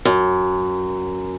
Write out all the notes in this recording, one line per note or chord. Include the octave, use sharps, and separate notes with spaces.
F#2